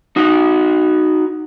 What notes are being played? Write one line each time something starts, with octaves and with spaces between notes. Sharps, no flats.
D#4 F#4